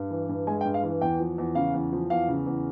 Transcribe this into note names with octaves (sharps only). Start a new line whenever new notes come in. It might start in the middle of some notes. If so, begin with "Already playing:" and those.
Already playing: G2
E3
G2
G#3 G#5
G5
G2
F5
E3
E2 G5
F3
E2
C#3 F5
E2
F3
E2 F5
C#3
E2